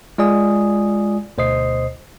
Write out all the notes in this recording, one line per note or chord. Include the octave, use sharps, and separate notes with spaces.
G#3 F4 D5 G#5 D#6
D2 B2 C5 D#5 D#6 C7